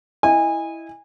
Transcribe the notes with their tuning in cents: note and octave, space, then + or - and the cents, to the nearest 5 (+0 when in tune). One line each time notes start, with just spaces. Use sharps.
E4 +0 D#5 +0 G#5 -25